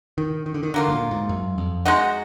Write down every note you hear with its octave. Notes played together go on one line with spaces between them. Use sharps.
D#3
D#3
D3
D#3
D3 F#3 A#3 F4
G#2
A#2
G#2
F#2
F2
G#3 D#4 F#4